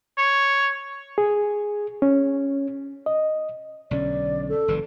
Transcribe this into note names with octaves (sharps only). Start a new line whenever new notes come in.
C#5
G#4
C#4
D#5
B1 D3 C#4 D5
A4
F#1 E3